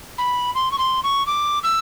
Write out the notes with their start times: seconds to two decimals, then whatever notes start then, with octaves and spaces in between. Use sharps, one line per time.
0.18 B5
0.55 C6
0.71 C#6
0.78 C6
1.03 C#6
1.26 D6
1.63 E6